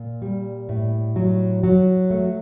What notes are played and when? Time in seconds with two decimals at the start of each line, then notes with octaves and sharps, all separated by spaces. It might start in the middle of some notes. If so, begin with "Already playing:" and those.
Already playing: A#2
0.22 G3
0.69 A2
1.16 F#3
1.63 F#3
2.10 A3